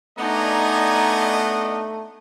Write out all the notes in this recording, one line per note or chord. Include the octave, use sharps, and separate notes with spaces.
A3 B3 D4 D#4 D5 D#5 G#5 A#5